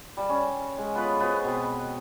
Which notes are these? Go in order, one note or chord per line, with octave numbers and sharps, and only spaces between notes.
G3 A5
C#4
G#3
B3 F4 B4 C#5
B3 F#4 C5 D#5
B2 C4 B4